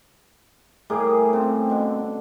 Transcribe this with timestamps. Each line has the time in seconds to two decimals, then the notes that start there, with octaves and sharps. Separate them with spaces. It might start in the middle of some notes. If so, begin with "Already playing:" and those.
0.90 A2 G3 A#3 G#4
1.33 C#3 C4
1.70 B2 D3